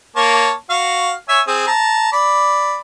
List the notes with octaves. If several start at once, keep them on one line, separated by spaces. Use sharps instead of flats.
A#3 C#5 A5
F#4 F5
C#5 E5 G#5
C4 G#4
A5 A#5
D5 B5